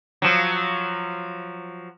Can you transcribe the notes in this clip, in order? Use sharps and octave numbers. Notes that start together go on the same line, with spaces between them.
F3 F#3